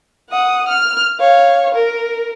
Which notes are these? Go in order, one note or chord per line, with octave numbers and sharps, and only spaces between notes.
F#5 D#6
F6
C#5 F5
A#4